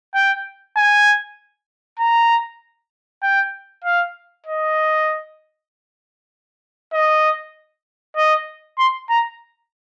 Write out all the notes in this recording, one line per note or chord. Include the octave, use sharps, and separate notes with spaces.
G5
G#5
A#5
G5
F5
D#5
D#5
D#5
C6
A#5